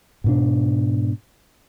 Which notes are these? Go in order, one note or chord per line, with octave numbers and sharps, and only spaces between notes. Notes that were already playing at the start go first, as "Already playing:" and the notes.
G#2 B2 D4